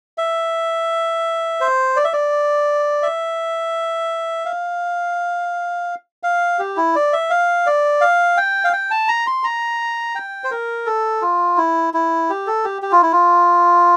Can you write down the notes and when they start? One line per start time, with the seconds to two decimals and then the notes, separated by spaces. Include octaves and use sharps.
0.18 E5
1.61 C5
1.96 D5
2.04 E5
2.13 D5
3.03 E5
4.45 F5
6.23 F5
6.59 G4
6.77 E4
6.95 D5
7.13 E5
7.30 F5
7.66 D5
8.01 F5
8.37 G5
8.64 F5
8.73 G5
8.91 A5
9.08 A#5
9.27 C6
9.44 A#5
10.15 G5
10.44 C5
10.51 A#4
10.86 A4
11.22 F4
11.57 E4
11.94 E4
12.30 G4
12.47 A4
12.65 G4
12.82 G4
12.92 F4
13.02 E4
13.12 F4